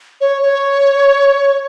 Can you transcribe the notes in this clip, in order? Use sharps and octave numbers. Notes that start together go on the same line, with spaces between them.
C#5
C#5